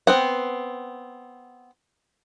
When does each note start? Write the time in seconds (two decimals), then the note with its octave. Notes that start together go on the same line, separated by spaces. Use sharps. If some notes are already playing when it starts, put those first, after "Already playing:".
0.07 B3 C4 F#5